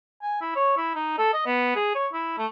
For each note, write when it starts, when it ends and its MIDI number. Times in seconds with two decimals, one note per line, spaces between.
0.22 0.38 80
0.41 0.54 64
0.56 0.76 73
0.78 0.94 64
0.95 1.16 63
1.18 1.33 69
1.34 1.41 75
1.46 1.74 59
1.76 1.94 68
1.95 2.07 73
2.13 2.36 64
2.38 2.46 57